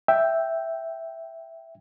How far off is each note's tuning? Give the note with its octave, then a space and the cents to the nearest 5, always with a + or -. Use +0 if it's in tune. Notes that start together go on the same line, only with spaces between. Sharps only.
E5 +0 G5 +0